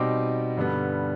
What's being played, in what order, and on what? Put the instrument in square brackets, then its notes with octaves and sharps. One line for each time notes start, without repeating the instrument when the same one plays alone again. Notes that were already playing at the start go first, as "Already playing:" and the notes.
Already playing: [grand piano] B2 G3 C4 D#4 D6
G2 D3 G3 B3